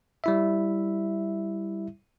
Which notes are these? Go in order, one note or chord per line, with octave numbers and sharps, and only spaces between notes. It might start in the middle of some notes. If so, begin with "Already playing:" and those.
G3 E4 E5